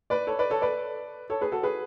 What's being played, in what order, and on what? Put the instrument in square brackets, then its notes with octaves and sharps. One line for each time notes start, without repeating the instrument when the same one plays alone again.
[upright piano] B4 D5
A4 C#5
B4 D5
A4 C#5
B4 D5
A4 C#5
G#4 B4
F#4 A4
G#4 B4